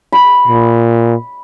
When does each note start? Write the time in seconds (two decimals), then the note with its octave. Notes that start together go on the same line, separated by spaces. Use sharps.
0.12 B5
0.47 A#2